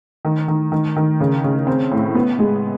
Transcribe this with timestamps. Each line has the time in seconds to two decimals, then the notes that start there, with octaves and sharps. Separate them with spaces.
0.25 D#3
0.48 D#3
0.72 D#3
0.96 D#3
1.20 C#3
1.44 C#3
1.67 C4
1.91 A2
2.15 B3
2.39 G#3